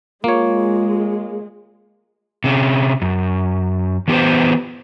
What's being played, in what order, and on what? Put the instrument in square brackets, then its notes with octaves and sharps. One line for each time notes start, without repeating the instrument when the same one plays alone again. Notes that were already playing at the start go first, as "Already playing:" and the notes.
[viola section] G#3 [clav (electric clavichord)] A#3 C#5 [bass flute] F4
[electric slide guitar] C3 C#4
F#2
E3 B3 G4 A4 B4 C5